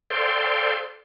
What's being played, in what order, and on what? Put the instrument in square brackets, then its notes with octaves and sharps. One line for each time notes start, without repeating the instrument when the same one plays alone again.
[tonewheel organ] A4 C5 D5 F5 G5 C6